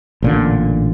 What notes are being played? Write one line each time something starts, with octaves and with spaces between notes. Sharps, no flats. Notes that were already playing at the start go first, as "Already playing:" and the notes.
A1 A#2 D3